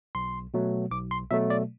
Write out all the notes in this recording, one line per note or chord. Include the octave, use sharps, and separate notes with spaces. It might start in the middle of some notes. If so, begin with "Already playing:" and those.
B1 C6
B2 F#3 A3
B1 D6
C6
B2 F#3 A3 E5
D5